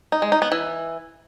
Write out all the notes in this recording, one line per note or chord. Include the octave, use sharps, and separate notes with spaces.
D#4
G#3
D#4
B3
E3